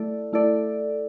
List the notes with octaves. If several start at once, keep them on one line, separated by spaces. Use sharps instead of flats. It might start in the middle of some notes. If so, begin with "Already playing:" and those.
Already playing: A3 E4 A4 D5
A3 E4 A4 D5